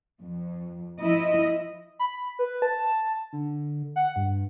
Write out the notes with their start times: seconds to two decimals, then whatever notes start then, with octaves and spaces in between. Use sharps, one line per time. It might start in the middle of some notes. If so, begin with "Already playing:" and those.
0.21 F2
1.00 F3 E4 D#5
1.99 B5
2.39 B4
2.62 A5
3.33 D3
3.96 F#5
4.16 G2